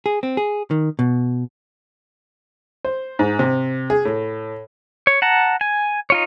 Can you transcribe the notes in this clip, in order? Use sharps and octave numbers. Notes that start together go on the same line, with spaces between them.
G#4
C4
G#4
D#3
B2
C5
G#2
C3
G#4
A2
C#5
F#5 A5 A#5
G#5
D#4 F4 C#5